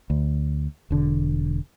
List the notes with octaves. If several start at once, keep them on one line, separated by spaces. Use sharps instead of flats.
D2
E1 D3